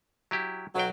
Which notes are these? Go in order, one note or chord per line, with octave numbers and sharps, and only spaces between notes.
F#3 E4 G4
B1 F#3 G5